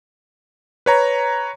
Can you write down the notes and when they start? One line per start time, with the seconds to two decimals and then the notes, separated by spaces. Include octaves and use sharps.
0.86 B4 C#5 A#5